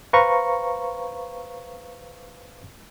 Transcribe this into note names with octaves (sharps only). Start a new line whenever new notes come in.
B4 C5 F5 A#5 C#6